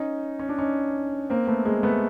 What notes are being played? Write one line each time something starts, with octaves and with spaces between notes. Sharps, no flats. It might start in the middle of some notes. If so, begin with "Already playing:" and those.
Already playing: C#4 D#4
C#4
D4
C#4 D#4
A#3 C4
A3 B3
G#3 A#3
A3 B3